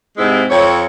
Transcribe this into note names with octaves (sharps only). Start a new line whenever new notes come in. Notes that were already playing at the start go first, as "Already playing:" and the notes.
G#2 C3 G#3 C4 E4
F2 C4 C#5